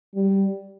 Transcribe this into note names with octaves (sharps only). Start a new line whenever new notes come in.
G3